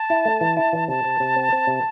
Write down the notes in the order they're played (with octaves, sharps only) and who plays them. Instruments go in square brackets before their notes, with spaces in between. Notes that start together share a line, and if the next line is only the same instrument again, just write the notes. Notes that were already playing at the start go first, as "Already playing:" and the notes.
Already playing: [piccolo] A5
[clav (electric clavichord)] E4
A3
E3
E4
E3
[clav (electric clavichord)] C3 [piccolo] A5
[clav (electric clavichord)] C3
C3
C4
C4
C3